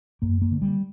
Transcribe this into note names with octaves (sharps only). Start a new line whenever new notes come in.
F#2 A#3
A#3
D3
G3